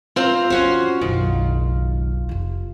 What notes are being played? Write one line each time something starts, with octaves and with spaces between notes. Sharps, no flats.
C4 F4 C5 A#5
F2 E3 C#4 F#4 C5
F#1 B1 D#3
F1 F4